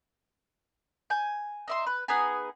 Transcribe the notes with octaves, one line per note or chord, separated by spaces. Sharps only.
G#5 G6
D#4 E5 C6
B4
B3 D#4 G#4 G#5